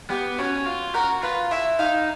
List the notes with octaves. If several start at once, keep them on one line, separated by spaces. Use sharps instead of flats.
B3 G4
C#4 F#4
F4
F#4 A#4
F4 B4
E4 E5
D#4 F5